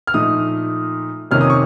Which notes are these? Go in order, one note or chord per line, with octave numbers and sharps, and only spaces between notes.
F6
A#2 F3 A3 D#4 D#6
F2 C3 D#3 A#3 C#4 F6
D#6
C#6